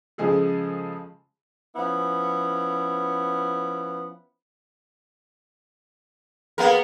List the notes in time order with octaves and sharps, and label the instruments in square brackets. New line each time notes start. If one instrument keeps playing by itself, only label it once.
[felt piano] C#3 F3 G#3 G#4 A4
[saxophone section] F3 B3 C#4 E4
[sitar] A#3 B3 A#4 [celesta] G#4 B4 F5